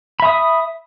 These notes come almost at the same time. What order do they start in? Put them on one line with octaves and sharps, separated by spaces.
B5 E5 D#6